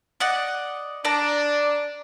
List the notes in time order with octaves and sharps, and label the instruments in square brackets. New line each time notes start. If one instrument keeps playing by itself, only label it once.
[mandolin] D5 D#5 F#5
[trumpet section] D4 [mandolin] D5 A5 A#5